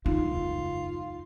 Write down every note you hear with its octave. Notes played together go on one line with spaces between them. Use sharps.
E1 C#2 F#2 D#4 F4